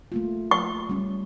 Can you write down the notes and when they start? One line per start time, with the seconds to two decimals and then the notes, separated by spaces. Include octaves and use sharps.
0.12 A3 A#3 F4
0.51 C#6
0.89 G3 C#4